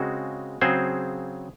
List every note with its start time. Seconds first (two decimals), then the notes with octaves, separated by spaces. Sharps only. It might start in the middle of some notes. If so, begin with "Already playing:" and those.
Already playing: C#3 G#3 C4 F#4
0.61 C#3 F#3 C4 G#4 C5